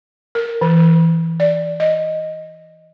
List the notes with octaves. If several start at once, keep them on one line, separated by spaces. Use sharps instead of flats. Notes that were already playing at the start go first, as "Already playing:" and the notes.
A#4
E3
D5
D#5